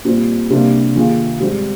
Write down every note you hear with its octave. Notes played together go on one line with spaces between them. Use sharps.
A#2 G3 C4
C3 G3 A#3 D4
D#3 A#3 F4 G#4
G#2 G3 C4